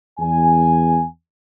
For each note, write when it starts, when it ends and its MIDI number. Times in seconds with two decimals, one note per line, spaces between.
0.19 1.04 40
0.19 1.04 80